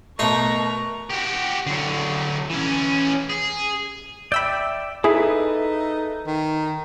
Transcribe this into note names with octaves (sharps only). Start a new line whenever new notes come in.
B2 A3 A#4 C#5 D#5 A#5 C6 C#6
F#4 G4
D3 F#3
E3 C#4
G#4
D5 E5 G5 B5 E6 G6
D#4 E4 G#4 A4 B4 E5
D#3